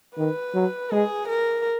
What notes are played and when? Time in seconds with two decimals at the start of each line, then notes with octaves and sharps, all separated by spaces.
0.17 D#3 B4
0.54 F#3
0.91 G#3 G#4
1.28 A#4